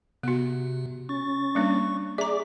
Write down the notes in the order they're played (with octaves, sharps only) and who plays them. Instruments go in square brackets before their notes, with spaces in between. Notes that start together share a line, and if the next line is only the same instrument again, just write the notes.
[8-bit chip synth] C3 [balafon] B3 F#4
[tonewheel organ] C#4 A6 [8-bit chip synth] C#6
[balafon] G3 A#3 D4
[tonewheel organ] G#4 D5 D6 [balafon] E5 A#5